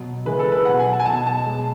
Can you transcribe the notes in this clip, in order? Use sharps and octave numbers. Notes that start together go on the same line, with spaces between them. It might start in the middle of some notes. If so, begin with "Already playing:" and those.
Already playing: B2 F#3
C#3 E3 G#3 B4
A4
B4
B2 F#3 F#5
G#5
A5
G#5
B2 F#3 A5
A5
B2 G#3